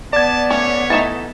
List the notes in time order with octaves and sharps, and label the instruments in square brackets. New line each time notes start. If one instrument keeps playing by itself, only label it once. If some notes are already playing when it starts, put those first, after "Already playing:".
[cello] B3 [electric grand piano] D5 G#6 [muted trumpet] A5
[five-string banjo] A3 C#4 [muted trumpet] C#5
[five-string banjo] E3 A3 D#4 [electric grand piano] A6 E7